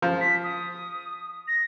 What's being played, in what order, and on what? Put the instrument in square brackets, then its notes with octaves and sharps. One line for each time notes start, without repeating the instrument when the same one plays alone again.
[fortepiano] F3
[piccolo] B6
D#6
A#6